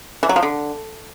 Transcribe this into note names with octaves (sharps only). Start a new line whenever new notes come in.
E3
F#3
F3
D3